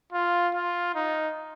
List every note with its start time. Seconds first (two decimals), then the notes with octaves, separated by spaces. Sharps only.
0.13 F4
0.54 F4
0.95 D#4